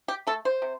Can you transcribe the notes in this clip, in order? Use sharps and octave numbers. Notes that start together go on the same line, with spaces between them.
G4
A3 A4
C5
C3